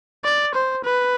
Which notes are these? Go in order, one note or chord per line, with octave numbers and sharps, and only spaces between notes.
D5
C5
B4